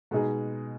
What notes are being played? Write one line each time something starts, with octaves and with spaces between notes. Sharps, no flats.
B2 G#3 D#4 G#4